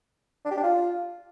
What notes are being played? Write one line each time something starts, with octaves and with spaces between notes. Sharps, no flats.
D4
G4
D4
F4